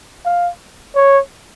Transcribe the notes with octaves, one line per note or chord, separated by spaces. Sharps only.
F5
C#5